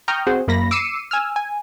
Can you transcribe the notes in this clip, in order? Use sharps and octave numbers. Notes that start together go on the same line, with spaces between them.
G5 A#5 C#6 D#6 F6 G6
C4 F#4 G#4 C5
F#2 A#3 B5 A#6
D6 E6 C7 C#7 D#7 E7
G#5 E6 F6
G#5